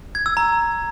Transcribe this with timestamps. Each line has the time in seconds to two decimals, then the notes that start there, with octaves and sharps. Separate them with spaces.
0.15 G#6
0.26 E6
0.37 A#5